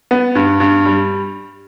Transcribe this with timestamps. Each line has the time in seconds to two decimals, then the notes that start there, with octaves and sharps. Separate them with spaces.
0.11 B3
0.35 G2
0.60 G2
0.85 G3